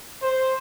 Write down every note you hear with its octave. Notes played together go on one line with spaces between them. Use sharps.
C5